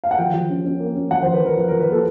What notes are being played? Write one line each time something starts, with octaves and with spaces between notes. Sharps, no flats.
F5
F#5
F3 G5
F3
C#4
C#4
A#3
C#4
F3 F#5
C5
F3
B4
F3 A#4
F3 B4
A#4
F3
B4
A#3 A4